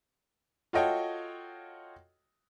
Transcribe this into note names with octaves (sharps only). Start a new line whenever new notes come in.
F4 F#4 A4 C#5 D#5 G5